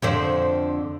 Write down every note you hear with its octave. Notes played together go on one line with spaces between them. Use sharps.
F2 D3 C5